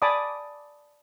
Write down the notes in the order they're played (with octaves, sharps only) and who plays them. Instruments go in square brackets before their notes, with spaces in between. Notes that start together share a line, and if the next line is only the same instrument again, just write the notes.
[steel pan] D5 G#5 A5 B5 D6 D#6